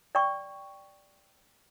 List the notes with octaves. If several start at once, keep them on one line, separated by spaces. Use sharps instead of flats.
D5 G5 C#6